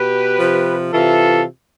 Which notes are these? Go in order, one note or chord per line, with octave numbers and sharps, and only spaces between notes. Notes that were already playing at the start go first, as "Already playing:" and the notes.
Already playing: B2 G4 B4
C3 F3
C3 E3 F4 A4